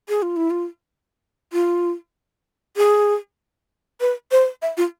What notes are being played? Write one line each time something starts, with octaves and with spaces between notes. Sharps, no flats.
G#4
F4
E4
F4
F4
G#4
B4
C5
E5
F4